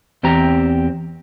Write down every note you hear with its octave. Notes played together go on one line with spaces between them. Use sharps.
E2 C4 G4 A#5